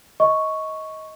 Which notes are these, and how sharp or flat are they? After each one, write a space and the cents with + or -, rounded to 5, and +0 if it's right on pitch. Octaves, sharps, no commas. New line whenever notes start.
D#5 +20 C#6 +0